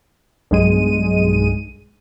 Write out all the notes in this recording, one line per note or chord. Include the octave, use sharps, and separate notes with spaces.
B1 G2 G#3 D#7